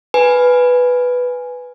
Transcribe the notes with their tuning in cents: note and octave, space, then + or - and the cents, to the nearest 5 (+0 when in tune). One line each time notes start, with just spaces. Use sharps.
B4 +0 G#5 +0